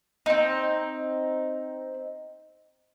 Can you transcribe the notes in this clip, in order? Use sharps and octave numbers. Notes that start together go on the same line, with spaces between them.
C4 D#4